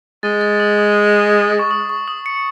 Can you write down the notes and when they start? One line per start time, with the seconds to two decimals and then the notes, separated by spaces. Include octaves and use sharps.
0.23 G#3 A6
0.41 A6
0.60 D#6
0.78 D#6
1.59 C#6
1.71 D#6
1.90 C#6
2.08 D#6
2.26 C#7